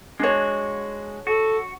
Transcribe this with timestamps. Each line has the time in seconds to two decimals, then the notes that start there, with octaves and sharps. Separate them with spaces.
0.20 G#3 D4 F#4 C#5
1.27 F#4 A4